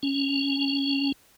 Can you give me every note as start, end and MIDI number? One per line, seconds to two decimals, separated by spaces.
0.03 1.12 61